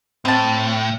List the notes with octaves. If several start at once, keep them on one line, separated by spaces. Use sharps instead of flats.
A2 C4 A5